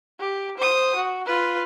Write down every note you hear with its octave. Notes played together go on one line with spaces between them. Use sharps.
G4
C5 D#6
F#4
F4 B4